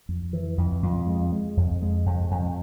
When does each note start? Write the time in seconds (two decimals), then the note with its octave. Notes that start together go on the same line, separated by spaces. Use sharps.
0.09 F2
0.33 E3
0.58 F2
0.82 F2
1.07 G#3
1.32 G#3
1.57 F2
1.82 G#3
2.06 F2
2.31 F2